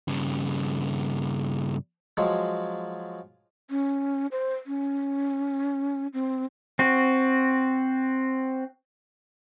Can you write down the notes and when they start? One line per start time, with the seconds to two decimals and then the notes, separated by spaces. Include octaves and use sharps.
0.08 G2 C#3
2.17 F3 F#3 G#3
3.70 C#4
4.32 C5
4.67 C#4
6.13 C4
6.79 C4 F#4